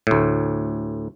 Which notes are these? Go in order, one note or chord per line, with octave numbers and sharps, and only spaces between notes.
D2 A2